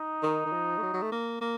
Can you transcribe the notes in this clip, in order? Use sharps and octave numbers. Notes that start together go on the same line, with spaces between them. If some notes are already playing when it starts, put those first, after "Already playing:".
Already playing: D#4
D#3
D#3
F3
A3
F#3
F#3
A3
A#3
A#3